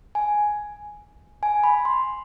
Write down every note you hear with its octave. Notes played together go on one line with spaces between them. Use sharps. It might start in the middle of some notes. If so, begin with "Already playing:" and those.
G#5
G#5
B5
C6